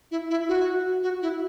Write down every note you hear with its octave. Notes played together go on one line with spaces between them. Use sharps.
E4
E4
F#4
F#4
E4